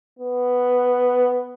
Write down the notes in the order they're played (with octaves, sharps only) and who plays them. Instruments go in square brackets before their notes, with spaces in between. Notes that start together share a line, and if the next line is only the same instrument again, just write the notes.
[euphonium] B3